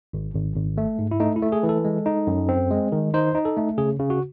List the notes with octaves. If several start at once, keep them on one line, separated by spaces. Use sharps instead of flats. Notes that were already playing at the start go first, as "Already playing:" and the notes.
G#1
G#1
G#1
A3
G#2
E4
A3 D#4
E4
A3
G#4
E3
A4
G#3
D#4
F#2
C4
G#3
D#3
D#4 C5
D#4
A4
A3
C#3 G#4
C#3
F#4